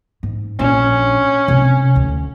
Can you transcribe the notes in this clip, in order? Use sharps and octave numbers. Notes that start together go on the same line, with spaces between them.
G#2
A#1 C#4 D4
C3 D4
D2